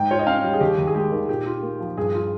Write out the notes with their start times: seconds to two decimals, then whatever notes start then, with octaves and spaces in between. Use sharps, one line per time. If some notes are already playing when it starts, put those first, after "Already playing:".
Already playing: G#2 G5
0.11 F4 C#5
0.19 D#5
0.26 C#4 F5
0.44 G3
0.53 G#4
0.61 D#2 G4
0.78 D#2
0.87 G#4
0.94 G#3 G4
1.12 D#3
1.29 A#2 G4
1.46 F4
1.63 A#3
1.80 F3
1.97 G2 G#4
2.14 F4